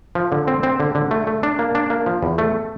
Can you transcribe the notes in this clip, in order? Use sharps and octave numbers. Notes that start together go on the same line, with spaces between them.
F3
D3
C4
C4
D3
D3
A3
A3
D4
A#3
D4
A#3
F3
E2
A3